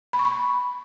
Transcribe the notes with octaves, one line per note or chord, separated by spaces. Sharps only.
B5
C#6
B5